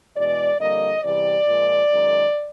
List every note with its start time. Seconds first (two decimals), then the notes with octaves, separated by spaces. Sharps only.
0.16 E2 B2 G#3 D5
0.59 F2 D3 G3 A#3 D#5
1.03 E2 C3 E3 G3 D5
1.47 A#2 F3 G#3
1.91 F#2 D#3 G#3